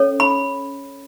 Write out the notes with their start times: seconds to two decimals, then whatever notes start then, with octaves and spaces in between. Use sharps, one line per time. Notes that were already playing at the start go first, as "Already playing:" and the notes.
Already playing: C#4 A4 C#5
0.20 B5